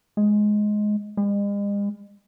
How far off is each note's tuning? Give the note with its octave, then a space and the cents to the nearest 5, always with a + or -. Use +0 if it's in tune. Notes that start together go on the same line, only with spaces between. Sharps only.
G#3 +10
G#3 -45